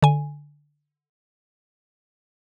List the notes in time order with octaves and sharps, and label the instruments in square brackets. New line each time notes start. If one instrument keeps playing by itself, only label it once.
[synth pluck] D3 G#5